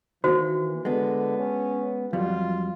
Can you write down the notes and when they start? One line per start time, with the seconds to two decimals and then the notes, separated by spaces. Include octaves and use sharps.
0.24 D#3 E3 A#3 F#4 C5
0.85 D3 G#3 B3
1.38 C#4
2.13 F2 F#3 G3 F4